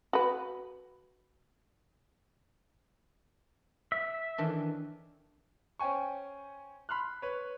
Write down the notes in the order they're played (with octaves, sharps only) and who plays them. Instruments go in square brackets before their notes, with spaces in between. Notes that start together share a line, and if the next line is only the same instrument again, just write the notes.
[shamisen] F#4 B4
[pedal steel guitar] E5
[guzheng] D#3 E3 D4
[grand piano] C#4 C5 G5 G#5 C#6
B5 C6 F6 F#6
B4 C#5